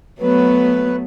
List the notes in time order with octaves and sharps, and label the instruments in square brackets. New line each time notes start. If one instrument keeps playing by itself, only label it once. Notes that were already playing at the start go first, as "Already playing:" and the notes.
[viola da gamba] F#3 A3 B3 [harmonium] B4